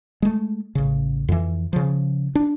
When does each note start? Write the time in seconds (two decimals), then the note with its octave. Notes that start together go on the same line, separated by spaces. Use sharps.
0.22 G#3 A3
0.75 A1 C#3
1.28 F2 E3
1.73 C#3 F3
2.35 D4